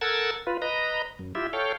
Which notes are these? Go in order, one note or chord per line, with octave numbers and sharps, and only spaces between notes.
A4 A#4 F#5 E6 G#6 A6
F4 B4
B4 D#5 A#5
F#2
E4 F4 G4 E5
A4 C#5 F5 G5